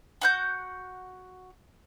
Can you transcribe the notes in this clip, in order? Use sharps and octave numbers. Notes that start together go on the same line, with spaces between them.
F#4 F#5 G6